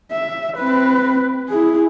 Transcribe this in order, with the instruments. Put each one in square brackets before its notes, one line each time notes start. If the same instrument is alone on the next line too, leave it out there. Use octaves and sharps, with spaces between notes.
[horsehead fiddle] E5
C4 B4
E4 G#4